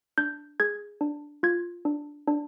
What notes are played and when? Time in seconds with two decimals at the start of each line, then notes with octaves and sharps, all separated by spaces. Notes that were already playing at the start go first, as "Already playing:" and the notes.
0.18 D4 G6
0.60 G#4 G#6
1.01 D4
1.43 F4 G#6
1.85 D4
2.28 D4